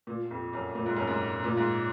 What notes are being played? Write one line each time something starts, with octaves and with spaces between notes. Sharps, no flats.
A#2
F2
F#2
A#2
G#2
F#2
G#2
A#2
G#2